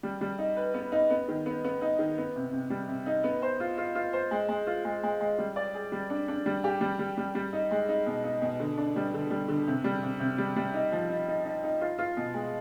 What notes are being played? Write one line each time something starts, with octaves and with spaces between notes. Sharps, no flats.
G3
G3
D#4
B4
B3
D#4
B3
D#3
B3
B3
D#4
D#3
B3
C3
C3
G3
C3
D#4
B3
C5
F4
F4
F4
C5
G#3
G#3
F4
G#3
G#3
G#3
G3
D5
G#4
G3
D4
D4
G3
G4
G3
G3
G3
G3
D#4
G#3
D#4
B2
D#4
B2
D3
D4
G3
D3
G3
D3
C3
G3
C3
C3
G3
G3
D#4
F3
D#4
D#4
D#4
D#4
F4
F4
B2
G#3